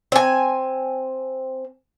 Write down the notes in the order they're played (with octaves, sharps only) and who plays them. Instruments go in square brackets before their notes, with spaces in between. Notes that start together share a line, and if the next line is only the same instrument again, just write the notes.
[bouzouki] C4 G#5